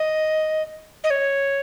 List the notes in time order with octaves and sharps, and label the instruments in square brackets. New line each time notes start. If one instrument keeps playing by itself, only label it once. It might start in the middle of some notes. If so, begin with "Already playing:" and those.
Already playing: [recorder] D#5
D#5
C#5